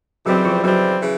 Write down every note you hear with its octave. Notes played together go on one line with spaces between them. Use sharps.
C#3 E3 F#3 G3 C4 F#4
F3 F4
C#3 E3 F#3 G3 C4 F#4
C#3 E3